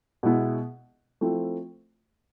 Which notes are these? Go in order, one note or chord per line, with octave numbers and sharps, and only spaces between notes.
B2 G#3 B3 E4
F3 A3 C4 E4